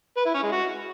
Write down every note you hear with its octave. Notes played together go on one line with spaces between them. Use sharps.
B4
E4
C#4
G#3
F#4